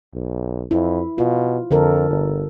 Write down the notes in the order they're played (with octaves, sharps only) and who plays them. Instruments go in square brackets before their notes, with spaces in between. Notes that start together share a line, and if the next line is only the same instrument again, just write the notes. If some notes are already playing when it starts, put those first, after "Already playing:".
[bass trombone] B1
[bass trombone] F2 [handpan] E4
[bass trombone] B2 [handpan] F4
[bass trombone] F2 [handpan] D3 A4 A#4
[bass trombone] G1